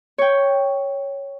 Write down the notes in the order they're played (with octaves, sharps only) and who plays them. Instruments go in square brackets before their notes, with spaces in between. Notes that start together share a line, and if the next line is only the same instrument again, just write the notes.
[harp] C#5 G5